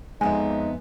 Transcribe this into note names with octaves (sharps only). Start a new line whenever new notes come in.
F2 G#3 B3 D#4 E5 G#5 C6